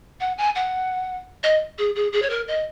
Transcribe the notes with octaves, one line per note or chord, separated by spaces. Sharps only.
F#5
G#5
F#5
D#5
G#4
G#4
G#4
C#5
A#4
D#5